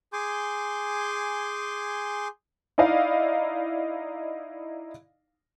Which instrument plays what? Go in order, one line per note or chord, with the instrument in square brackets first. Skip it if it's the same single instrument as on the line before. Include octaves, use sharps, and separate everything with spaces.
[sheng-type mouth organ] G#4 G#5 C6 D6 G6
[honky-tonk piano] D#4 E4 D5 D#5 F5